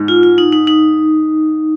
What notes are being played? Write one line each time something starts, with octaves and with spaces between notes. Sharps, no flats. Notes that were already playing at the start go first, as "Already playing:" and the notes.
Already playing: G#2
F4
F4
D#4
D#4
D#4